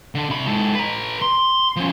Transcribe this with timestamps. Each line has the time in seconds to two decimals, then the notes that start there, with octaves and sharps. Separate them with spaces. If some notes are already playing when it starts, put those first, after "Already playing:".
0.15 D3
0.30 C3 B5
0.47 G#2 A4
0.75 B4 A#5
1.22 C6
1.76 F3 C#4